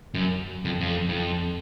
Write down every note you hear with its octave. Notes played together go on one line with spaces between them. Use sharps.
F#2
F2
F2
F2